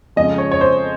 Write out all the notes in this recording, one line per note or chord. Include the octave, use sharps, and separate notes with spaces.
F2 C#3 F3 G#3 D#5
C#5
C#5
C5